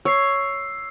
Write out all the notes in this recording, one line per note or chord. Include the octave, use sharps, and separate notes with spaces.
C#5 E6 C7